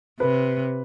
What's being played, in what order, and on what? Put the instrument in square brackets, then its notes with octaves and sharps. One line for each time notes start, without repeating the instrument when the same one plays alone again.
[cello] C3 [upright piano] B4